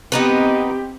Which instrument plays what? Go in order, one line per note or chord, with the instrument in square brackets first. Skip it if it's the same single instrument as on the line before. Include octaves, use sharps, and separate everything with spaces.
[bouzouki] B3 D#4 B4 [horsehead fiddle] C4 G4